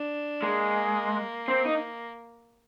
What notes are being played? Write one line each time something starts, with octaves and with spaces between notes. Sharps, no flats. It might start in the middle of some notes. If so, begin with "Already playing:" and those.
Already playing: D4
G#3 A#3
C4
D#4